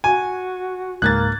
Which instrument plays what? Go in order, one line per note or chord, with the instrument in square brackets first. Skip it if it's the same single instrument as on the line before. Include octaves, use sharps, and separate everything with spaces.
[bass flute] F#4 [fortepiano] G#5
[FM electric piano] C#2 G#2 [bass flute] A#3 [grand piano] F#6 G#6 A6